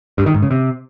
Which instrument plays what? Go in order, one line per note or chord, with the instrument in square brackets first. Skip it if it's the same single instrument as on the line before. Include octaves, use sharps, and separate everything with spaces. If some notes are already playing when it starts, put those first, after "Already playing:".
[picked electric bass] G2
D#3
G#2
C#3
C3